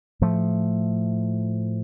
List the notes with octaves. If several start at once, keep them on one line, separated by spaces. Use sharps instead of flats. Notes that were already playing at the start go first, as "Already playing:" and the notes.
A2 F3 A3